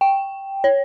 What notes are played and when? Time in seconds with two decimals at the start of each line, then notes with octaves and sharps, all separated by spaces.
0.01 G5
0.64 C#5